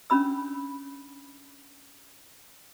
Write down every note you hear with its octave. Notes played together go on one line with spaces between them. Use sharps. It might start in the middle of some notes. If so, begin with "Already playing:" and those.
C#4 D4 B5 E6